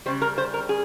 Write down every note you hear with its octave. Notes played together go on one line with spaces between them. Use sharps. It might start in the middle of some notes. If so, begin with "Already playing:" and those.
C#3 G3 C5
A#4
C5
A#4
G#4